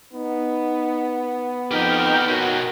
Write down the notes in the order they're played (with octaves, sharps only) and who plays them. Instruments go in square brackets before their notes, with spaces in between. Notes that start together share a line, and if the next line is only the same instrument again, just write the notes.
[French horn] B3 [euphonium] D#4
[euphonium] F2 [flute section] D#4 G5 F6 [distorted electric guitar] G4 A#4
[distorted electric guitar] B2 C#4 [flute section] F#4 D#5 [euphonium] A#4